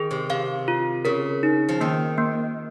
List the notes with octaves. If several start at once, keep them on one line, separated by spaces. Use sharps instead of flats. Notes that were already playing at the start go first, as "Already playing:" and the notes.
Already playing: D#3 G#4
C3
C3 F5
F4
C#3 A#4
D#4
F3
D#3 A#3
A#3